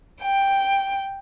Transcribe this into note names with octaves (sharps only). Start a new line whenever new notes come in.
G5